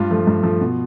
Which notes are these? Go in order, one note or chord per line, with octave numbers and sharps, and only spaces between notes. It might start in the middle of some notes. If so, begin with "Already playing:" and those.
Already playing: G2 F4
F3 A3
G2
F3 A3
B2